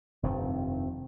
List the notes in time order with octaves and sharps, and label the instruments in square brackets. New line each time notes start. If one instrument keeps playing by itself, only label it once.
[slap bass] F1 G2 D#3 [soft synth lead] C4